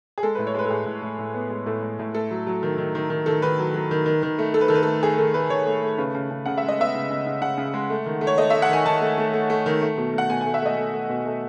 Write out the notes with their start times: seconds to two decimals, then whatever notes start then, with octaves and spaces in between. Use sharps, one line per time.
0.18 G#4
0.23 G#3 A4
0.35 A2 B4
0.47 C#5
0.55 G#3 B4
0.65 A4
0.70 A2 G#4
0.86 A2
1.02 A2
1.19 A2
1.34 B3
1.50 G#3
1.66 A2 A4
1.82 A2
1.99 A2
2.15 A3 A4
2.31 F#3
2.47 F#3
2.63 D#3
2.78 D#3
2.95 D#3
3.10 D#3
3.26 D#3 A4
3.42 D#3 B4
3.59 F#3
3.74 F#3
3.91 D#3
4.06 D#3
4.23 D#3
4.39 A3
4.54 A3 A4
4.61 B4
4.68 D#3 A4
4.75 B4
4.83 A3 A4
5.03 A3 G#4
5.18 D#3 A4
5.34 A3 B4
5.50 D#3 C#5
5.67 A3
5.83 A3
5.98 C#3 B4
6.15 C#3
6.31 C#3
6.46 C#3 F#5
6.58 E5
6.63 G#3
6.68 D#5
6.79 B3 E5
6.95 C#3
7.10 C#3
7.26 C#3
7.41 C#3 F#5
7.57 C#3
7.74 G#3
7.90 A3
8.06 D#3
8.21 A3
8.27 C#5
8.38 A3 D#5
8.50 A3 E5
8.62 F#5
8.69 D#3 G#5
8.85 D#3 A5
9.01 A3
9.18 A3
9.34 A3
9.50 A3
9.66 D#3
9.82 A3
9.97 B2
10.14 A3 F#5
10.30 B2 G#5
10.41 G#5
10.46 A3
10.54 E5
10.62 A3 D#5
10.77 A3
10.94 A3
11.09 B2
11.25 A3